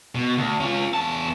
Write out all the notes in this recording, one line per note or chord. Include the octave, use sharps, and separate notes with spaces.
B2
D2
C#4 F4
E2 A5